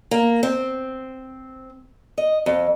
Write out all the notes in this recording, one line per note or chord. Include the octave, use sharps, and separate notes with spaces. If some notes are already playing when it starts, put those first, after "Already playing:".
A#3
C4
D#5
F2